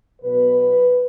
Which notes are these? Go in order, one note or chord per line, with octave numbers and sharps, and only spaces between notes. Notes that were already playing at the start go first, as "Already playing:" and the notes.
B2 F#3 B3 B4